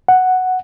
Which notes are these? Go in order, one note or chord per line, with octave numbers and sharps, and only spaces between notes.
F#5